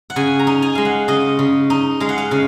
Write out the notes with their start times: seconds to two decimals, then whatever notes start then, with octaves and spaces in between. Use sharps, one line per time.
0.10 F#5
0.16 C#3 G#5
0.39 A#5
0.47 D#4
0.62 G#5
0.75 G#3 F5
0.85 F#5
1.08 C#3 D#5
1.39 C#3
1.70 D#4
2.00 G#3 F5
2.09 F#5
2.18 F5
2.31 C#3